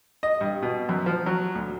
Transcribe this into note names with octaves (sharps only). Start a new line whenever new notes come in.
D#5
G2
B2
F#2
F3
F#3
D2